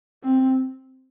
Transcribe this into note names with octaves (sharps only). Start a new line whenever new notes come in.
C4